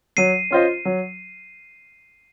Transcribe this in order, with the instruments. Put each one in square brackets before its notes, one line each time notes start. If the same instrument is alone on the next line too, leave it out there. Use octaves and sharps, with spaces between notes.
[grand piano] F#3 [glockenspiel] C7 D#7
[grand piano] C#4 F4 C5 D#5
F#3